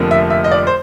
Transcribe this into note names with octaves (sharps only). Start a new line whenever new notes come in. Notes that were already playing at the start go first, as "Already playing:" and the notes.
Already playing: F1 F2 D3 F3 A#3
E5
E5
D#5
D5
C5